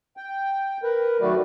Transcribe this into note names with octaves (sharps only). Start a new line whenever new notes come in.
G5
A#4 B4
D#3 F#3 A3 F#4 B4 D5